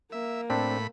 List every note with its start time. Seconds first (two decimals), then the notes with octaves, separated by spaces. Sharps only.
0.12 A#3 E5
0.50 A2 C4 D4 B5